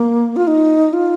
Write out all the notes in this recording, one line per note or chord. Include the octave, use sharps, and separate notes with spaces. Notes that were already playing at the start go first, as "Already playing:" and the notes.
Already playing: A#3
F4
D#4
F4